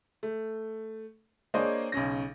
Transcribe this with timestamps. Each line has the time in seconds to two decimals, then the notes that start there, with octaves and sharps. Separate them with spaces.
0.23 A3
1.54 A#3 D4 G#4 C5 C#5 D#5
1.92 B1 C#3 C#4 A#6